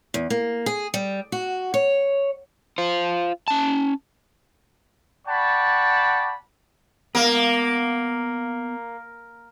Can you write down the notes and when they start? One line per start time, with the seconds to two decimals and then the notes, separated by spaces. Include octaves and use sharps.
0.14 E2
0.30 A#3
0.66 G#4
0.94 G3
1.32 F#4
1.74 C#5
2.78 F4 C5
3.48 C#4 A5
5.27 D5 F#5 G5 A5 B5 C#6
7.15 A#3 B3 F5